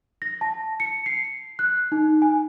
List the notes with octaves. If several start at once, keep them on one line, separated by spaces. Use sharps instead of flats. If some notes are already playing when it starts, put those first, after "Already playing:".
A#6
A5
C#7
C7
F#6
D#4
G#5